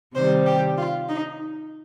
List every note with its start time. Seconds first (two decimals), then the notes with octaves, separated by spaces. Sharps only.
0.16 C3 D#3 G3 C5
0.46 G4
0.77 F4
1.09 D#4